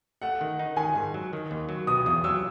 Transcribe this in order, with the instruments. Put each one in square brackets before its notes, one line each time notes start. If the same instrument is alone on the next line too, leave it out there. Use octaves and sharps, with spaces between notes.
[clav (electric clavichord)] A3 [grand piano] F#5
[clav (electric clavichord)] D#3
D#4
[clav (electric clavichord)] D#3 [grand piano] G#5
[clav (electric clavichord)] G#2
F#3
D#3
D#2
F#3
[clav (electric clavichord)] B2 [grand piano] D#6
[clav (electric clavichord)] E2 [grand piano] D#6
[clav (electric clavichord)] F#3 [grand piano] E6